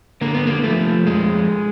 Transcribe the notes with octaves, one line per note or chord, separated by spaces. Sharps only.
D3 A#3
B3
A#3
F3 A3
F2 G#3